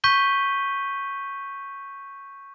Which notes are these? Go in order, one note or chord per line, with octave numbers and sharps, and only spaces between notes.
C#6 G6 B6 D#7 G7